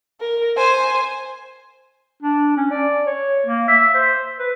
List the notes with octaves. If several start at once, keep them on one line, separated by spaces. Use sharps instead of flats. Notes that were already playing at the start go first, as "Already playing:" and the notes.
A#4
C5 G#5
D4
C#4
D5
C#5
A#3
E5
C5
B4